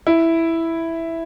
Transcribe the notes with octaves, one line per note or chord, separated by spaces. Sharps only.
E4